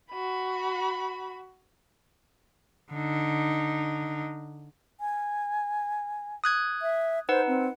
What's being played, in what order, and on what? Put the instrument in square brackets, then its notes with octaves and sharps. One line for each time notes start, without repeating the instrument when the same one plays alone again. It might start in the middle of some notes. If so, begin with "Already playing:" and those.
[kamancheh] F#4 B5
[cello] D3 D#4
[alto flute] G#5
[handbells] D#6 F#6 G#6
[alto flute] E5
[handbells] D#4 B4 F#5 [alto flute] C5
[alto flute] C4